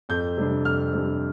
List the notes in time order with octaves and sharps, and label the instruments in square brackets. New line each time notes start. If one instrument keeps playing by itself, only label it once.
[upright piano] F2 G6
C3 G3 D4
F2 F6
C3 G3 D4